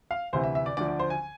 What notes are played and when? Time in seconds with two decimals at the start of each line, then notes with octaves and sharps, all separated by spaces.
0.11 F5
0.33 D2 C3 E3 C5
0.44 E5
0.55 E5
0.66 D5
0.77 D2 D3 F3 D5
0.88 D5
0.99 C5
1.10 G#5